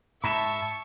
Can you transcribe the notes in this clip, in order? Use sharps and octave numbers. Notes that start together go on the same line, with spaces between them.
G#2 E5 A5 B5 C#6 E7